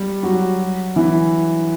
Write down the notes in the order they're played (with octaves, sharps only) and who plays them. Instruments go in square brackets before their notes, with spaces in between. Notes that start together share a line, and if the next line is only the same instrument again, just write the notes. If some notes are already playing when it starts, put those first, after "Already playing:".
Already playing: [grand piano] G3 G4
F#3 F#4
E3 E4